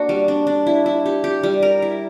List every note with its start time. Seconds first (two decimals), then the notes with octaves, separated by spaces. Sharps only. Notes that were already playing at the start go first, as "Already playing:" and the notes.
Already playing: A#3 D4 F#4
0.09 G3
0.28 D4
0.47 D4
0.67 E4
0.86 E4
1.06 G4
1.24 G4
1.43 G3
1.62 A#4
1.82 E4